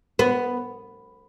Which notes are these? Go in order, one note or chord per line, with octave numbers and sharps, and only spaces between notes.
B3